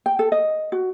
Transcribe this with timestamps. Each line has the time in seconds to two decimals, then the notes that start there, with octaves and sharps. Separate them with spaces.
0.06 G5
0.19 A4
0.32 D#5
0.72 F#4